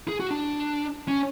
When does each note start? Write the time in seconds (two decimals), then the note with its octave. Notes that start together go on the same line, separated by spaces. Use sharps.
0.08 G#4
0.20 F#4
0.31 D4
1.08 C#4